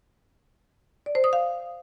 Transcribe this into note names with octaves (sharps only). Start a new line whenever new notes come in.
D5
C5
D#6
F5